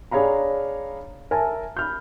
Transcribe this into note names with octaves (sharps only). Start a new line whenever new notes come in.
D4 G#4 C#5 F5 A#5 B5
A#4 E5 G#5 A5
B5 F6 G6